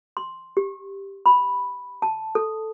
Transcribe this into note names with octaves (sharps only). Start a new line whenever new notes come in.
C6
G4
B5
A5
A4